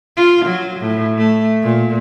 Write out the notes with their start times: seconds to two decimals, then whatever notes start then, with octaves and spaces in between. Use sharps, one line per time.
0.17 F4
0.46 F#3
0.80 A2
1.18 A3
1.63 A#2